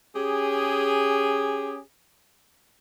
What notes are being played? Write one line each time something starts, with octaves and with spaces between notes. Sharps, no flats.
C#4 G4 G#4